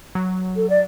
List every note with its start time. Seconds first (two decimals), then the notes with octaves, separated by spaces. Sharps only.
0.15 F#3
0.56 A4
0.69 D5